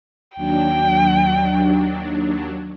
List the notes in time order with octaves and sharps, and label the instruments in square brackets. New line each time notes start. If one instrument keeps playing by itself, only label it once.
[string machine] D#2 F#3 D4 [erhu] G5